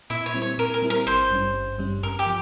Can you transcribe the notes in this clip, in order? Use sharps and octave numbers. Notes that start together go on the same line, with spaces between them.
A#2 E4 E5
C#5
G3 C4 E4
C#5
A#2 A#4
A#4
G3 C4 E4
A#4
G#1 C5
G2 G3 C#4
G#1
G2 G3 C#4
G2 A#4
G4
F3